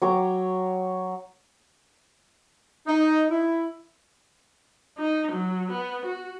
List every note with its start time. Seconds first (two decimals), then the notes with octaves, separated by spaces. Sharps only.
0.02 F#3 C#5 G5 D6
2.87 D#4
3.30 E4
4.98 D#4
5.32 F#3
5.71 B3
6.05 F#4